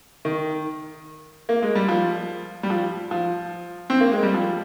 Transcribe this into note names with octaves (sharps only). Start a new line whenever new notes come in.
D#3
A#3
G#3
G3
F3
G3
F3
F3
C4
A#3
G#3
G3
F3